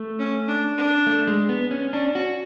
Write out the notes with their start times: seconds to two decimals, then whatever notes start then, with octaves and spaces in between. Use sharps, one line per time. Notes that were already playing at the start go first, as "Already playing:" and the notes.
Already playing: A3
0.19 C#4
0.48 D4
0.77 D4
1.07 A3
1.27 G#3
1.49 B3
1.71 C#4
1.93 C#4 D4
2.15 F#4